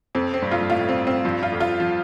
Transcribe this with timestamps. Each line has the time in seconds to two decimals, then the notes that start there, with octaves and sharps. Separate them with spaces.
0.15 F2 C4
0.34 C4
0.42 G2
0.51 F2 F4
0.61 G2
0.70 A2 F4
0.89 C4
1.07 C4
1.25 G2 F3
1.43 F4
1.52 F2
1.60 F4
1.80 F3